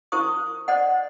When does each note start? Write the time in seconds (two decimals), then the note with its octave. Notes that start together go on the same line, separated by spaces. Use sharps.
0.12 E4 A#4 C5 C#6 D#6
0.68 C5 D5 D#5 F#5